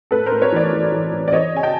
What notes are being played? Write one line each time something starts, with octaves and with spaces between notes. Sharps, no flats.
A2 A4 B4
A#4 C5
A2
B4 C#5
E3 C5 D5
E3
E3
E3
D5
E3 C#5 D#5
C#3 G#5
G5 A5